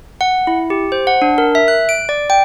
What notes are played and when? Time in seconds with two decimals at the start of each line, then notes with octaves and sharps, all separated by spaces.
0.21 F#5
0.47 E4
0.70 G4
0.92 C5
1.07 F#5
1.22 D4
1.38 A#4
1.55 E5
1.68 F#6
1.89 D7
2.09 D5
2.30 G5